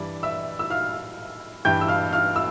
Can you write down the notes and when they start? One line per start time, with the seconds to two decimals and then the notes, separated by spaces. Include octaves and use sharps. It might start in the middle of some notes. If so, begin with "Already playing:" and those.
Already playing: G2 E3 G3 D5
0.23 E5 E6
0.59 E6
0.70 F5 F6
1.65 G2 E3 G3 G5 G6
1.81 E6
1.88 F5 F6
2.12 F5 F6
2.36 E6